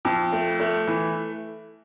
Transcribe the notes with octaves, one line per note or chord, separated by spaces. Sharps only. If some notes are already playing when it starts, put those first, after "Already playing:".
F2
A3
A3
E3